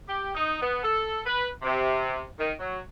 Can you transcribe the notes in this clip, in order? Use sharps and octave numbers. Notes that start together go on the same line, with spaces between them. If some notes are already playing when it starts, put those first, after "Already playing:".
G4
D#4
B3
A4
B4
C3
D#3
F#3